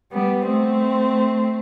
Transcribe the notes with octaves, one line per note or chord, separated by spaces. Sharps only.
G3 B3
A3 C4